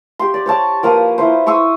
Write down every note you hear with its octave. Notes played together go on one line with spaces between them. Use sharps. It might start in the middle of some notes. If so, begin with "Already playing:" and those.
G4 C6
D5
C5 C#5 A5
F3 A#3 B4 D#6
E4 B4 C5
C6 C#6 D#6 E6